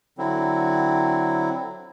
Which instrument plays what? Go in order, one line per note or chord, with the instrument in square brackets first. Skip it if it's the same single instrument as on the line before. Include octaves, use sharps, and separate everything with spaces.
[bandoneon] D3 F#3 C4 E4